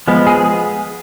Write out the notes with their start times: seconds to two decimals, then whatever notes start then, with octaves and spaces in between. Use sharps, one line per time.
0.08 F3 G#3 B3
0.27 G#4